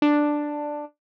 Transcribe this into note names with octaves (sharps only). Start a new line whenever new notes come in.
D4